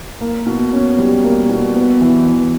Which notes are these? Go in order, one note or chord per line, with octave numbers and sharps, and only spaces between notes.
A#3
B2
C#4
G3
A#3
B2
B3
E3
E3